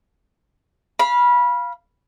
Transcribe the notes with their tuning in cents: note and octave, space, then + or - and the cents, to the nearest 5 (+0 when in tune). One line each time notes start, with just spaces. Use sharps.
F5 -5 B5 -20